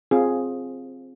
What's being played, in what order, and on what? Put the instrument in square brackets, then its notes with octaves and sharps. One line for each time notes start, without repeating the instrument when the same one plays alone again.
[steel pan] C4 F4 G#4